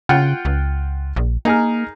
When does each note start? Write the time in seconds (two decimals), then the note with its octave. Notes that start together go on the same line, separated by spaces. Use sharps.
0.09 C#3 F4 F#5 G5
0.45 C#2
1.16 A#1
1.45 A#3 D#4 G#4 A#4